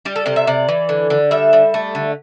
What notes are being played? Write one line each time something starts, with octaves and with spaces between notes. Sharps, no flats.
G3 G4
A4
C3 G4
E5
C3 D5
E3
D3
D3
G3 E5
G3
A3
D3